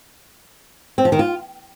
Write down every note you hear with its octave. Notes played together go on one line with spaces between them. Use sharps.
C4
F3
D#3
F4